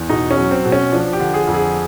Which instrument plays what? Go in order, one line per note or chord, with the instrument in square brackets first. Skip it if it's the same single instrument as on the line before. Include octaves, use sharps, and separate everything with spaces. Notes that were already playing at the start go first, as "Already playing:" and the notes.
Already playing: [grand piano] E2
B2 D#4
C#4
F#3
C4
B2
C#4
F3 D4
G4
D3
G#4
F2
G#4